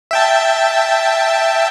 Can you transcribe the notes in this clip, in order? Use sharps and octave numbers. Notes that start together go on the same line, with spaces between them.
E5 G5 A5